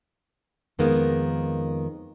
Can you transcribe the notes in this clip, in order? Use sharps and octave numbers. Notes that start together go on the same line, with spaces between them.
F2 D#3 G#3 A#3 B3